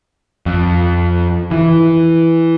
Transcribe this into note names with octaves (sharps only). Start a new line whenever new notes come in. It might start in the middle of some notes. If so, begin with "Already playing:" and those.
F2
E3